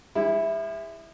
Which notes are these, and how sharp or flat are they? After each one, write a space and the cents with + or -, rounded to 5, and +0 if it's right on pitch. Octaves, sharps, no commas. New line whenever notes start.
G#3 -45 E4 +0